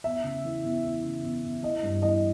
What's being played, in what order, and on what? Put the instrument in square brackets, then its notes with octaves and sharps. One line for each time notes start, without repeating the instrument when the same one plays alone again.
[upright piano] E2 E5
C#3
E3
E2
E3
C#3
E2
E2
E3 D#5
G2
E3 D#5